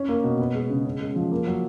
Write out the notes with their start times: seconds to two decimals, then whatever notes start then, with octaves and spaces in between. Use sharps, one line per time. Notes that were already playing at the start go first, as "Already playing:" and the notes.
Already playing: C#4
0.09 A#3
0.24 B2
0.39 B3
0.54 G#3
0.70 C#3
0.85 C#4
1.01 G#3
1.16 F3
1.31 A#3
1.47 F#3